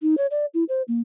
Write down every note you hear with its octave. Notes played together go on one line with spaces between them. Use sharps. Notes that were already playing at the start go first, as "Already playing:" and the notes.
D#4
C#5
D5
E4
C5
A#3